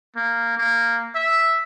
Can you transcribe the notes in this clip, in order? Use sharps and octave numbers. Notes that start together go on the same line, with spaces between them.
A#3
A#3
E5